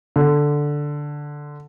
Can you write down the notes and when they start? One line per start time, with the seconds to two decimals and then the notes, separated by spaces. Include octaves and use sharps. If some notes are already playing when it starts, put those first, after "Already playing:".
0.16 D3